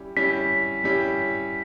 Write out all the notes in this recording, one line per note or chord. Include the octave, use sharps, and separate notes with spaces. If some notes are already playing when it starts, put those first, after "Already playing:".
Already playing: G3 C#4 E4 G4
G3 C#4 E4 G4 B6
G3 C#4 E4 G4